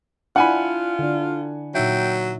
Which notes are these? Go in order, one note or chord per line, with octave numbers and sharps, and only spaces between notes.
D4 E4 F4 F#5 G#5 B5
D3 D4
A#2 F#3 D#4 E5 G5